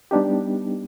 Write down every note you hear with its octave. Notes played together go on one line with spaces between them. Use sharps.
G3 B3 D4 D#4 G4